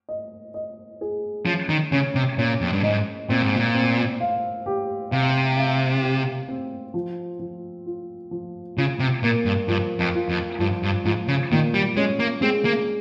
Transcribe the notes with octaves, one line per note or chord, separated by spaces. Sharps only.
D#5
D#5
G#4
F3 C#4
D#3
C#3 C#4
C3
A#2 C#4
F2
G2
G#2 D#5
A#2 C4
G#2
A#2
C4
F5
G4
C3 F5
F5
G4
C4
F3
F3
F4
F3
C#3 F4
C3
A#2 A#3
G2
G2 F3
F2
F4
F2
G2 F3
G2
G#2 F3
C#3
A#2 D#3
G3
G#3 C#4
A#3
G#3 C4
A#3